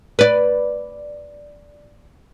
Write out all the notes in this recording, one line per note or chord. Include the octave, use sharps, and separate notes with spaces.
B4 D5